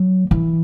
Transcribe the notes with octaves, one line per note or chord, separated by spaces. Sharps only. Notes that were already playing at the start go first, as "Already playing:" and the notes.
Already playing: F#3
E3